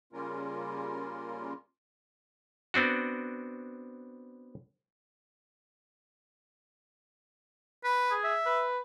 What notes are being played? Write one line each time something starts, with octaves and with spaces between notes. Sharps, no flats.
C#3 G3 A#3 C#4 F4 A#4
B3 C4 D4 F#4
B4
G#4
E5
B4